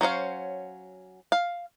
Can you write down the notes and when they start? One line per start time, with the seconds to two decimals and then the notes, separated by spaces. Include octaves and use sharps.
0.01 F#3 C#4 C5 F5
1.32 F5